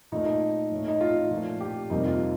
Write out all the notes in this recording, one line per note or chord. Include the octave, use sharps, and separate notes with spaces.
A#2 A3 D#4
D#4
A2 A3
D#4
F4
A#2 F3 A3
G4
F2 C3 G3 A#3 D#4
F4